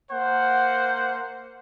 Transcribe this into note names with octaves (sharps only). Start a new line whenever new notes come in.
A#3 C5 F#5